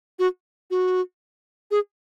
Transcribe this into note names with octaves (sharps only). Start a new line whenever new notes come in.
F#4
F#4
G#4